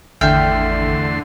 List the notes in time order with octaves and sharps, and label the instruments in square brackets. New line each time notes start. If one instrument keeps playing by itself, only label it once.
[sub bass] G#1 [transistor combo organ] E2 A3 C6 [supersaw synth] D3 [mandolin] E5 G5 F6